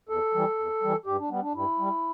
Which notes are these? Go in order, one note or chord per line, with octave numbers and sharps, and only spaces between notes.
E2 A4
E3 G3
E2
E3 G3
G2 G4
D4
G3 B3
D4
G2 E4
G3